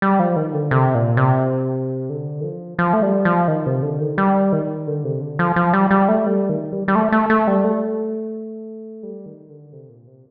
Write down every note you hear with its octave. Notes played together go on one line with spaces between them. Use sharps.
G3
F3
D#3
D3
C3
A#2
C3
D3
D#3
F3
F3
A3
G3
F3
D#3
C3
D3
D#3
G3
D#3
D3
C3
D3
F3
F3
G3
G3
A3
G3
D#3
G3
G3
A3
A3
A3
G3
A3
G3
D#3
D3
C3
A#2
C3